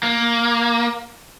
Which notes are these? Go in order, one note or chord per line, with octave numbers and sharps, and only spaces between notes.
A#3